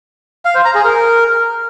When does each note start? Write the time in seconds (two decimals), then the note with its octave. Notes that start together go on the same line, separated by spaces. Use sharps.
0.45 F5
0.55 C5
0.65 A#5
0.75 G#4
0.85 A#4